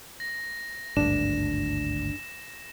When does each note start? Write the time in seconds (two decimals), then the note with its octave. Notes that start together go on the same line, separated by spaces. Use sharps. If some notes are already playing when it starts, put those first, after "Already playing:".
0.20 A#6
0.97 G#1 D2 G2 D4 E7